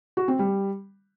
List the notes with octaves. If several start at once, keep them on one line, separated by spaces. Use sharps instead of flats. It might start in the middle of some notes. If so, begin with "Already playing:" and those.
F#4
C4
G3